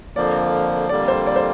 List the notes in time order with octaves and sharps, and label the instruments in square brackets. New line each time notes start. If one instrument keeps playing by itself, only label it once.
[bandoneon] F2 D3 F3 A#3 [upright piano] D5
[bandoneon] F2 D3 G3 A#3 [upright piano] D5
[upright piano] C5
D5
C5